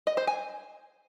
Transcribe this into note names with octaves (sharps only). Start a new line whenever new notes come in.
D#5
C5
G#5